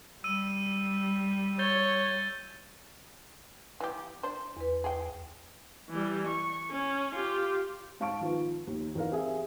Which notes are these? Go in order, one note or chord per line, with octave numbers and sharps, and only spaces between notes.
G3 E6 D#7
C#5 G6 A6 G7
E3 B3 G4
D4 C5
E2 B4
G#4 G5
E3 G3
C#6
C#4
F4 G4
G#2 F5 A5 C#6 D7
D#3 F3 B3
D#2 D#3
E2 D#4 A#4 F5
C4 G4 G#4 E5